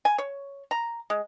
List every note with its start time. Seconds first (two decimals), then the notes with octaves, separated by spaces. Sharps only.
0.05 G#5
0.18 C#5
0.71 A#5
1.10 G#3